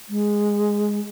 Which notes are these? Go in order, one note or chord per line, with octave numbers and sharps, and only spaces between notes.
G#3